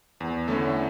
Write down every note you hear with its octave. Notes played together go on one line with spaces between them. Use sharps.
E2
D3 A3 C#4 E4